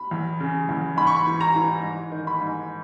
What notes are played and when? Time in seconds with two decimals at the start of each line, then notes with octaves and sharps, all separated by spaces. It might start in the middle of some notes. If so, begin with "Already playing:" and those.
Already playing: B5
0.11 E2
0.40 C#3
0.69 E2
0.97 G#2 B5
1.07 C#6
1.16 B5
1.27 E3
1.41 A#5
1.56 E3
1.83 G#2
2.12 D#3
2.27 B5
2.41 G#2